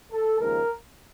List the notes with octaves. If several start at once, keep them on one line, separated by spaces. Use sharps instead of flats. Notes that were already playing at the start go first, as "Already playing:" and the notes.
A4
D#2 C#3 F3 G#3 A#4